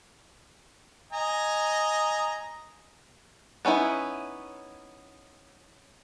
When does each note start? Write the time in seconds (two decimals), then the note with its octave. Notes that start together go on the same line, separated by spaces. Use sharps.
1.12 D#5 G#5 A#5
3.65 B3 C#4 D#4 E4